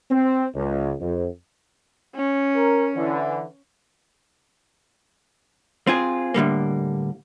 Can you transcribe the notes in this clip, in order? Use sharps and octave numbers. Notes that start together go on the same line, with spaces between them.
C4
C#2
F2
C#4
A#4
D3 E3
C4 F4 G#4
A2 D3 G3 A#3